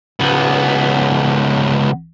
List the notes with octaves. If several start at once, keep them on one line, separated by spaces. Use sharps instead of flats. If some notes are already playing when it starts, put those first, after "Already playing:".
C#2 B3